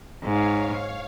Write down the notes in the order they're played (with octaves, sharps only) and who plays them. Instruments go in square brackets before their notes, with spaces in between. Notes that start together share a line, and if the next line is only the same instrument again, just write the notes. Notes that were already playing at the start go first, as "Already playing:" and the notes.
[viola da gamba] G#2 [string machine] C#5 F5